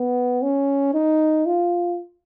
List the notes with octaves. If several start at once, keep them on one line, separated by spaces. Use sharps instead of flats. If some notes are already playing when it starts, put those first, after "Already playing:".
Already playing: B3
C#4
D#4
F4